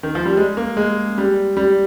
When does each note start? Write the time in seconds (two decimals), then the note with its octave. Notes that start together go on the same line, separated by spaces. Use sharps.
0.03 D#3
0.15 F3
0.26 G3
0.37 G#3
0.57 A#3
0.77 G#3
1.18 G3
1.57 G3